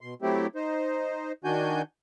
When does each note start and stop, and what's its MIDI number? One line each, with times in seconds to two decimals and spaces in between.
0.01 0.14 47
0.01 0.14 84
0.22 0.47 54
0.22 0.47 57
0.22 0.47 60
0.22 0.47 64
0.22 0.47 67
0.55 1.32 63
0.55 1.32 72
1.44 1.82 51
1.44 1.82 62
1.44 1.82 66
1.44 1.82 80
1.44 1.82 91